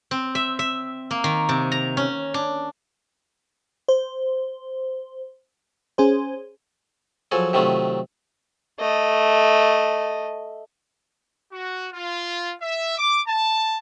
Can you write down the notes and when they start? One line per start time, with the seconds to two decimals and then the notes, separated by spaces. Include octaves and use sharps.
0.11 C4
0.35 E5
0.59 E5
1.11 A#3
1.24 D#3
1.49 C3
1.72 A#5
1.97 C#4
2.34 D4
3.88 C5
5.98 C#4 G#4 C5
7.31 F3 F#3 G#4 A4
7.53 C3 D#3 F#3 A3 F4
8.80 A3 D#5
11.52 F#4
11.93 F4
12.61 E5
12.97 D6
13.28 A5